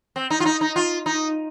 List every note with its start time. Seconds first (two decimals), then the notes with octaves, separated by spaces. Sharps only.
0.16 C4
0.30 D#4
0.40 F4
0.45 D#4
0.61 D#4
0.76 F4
1.06 D#4